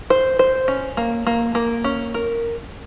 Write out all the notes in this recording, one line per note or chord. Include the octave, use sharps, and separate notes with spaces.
C5
C5
C#4
A#3
A#3
A#3
C#4
A#4